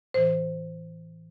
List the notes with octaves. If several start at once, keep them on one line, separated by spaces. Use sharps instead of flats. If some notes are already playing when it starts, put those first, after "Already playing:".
A2 E3 C5